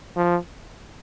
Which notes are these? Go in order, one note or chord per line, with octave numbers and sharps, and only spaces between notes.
F3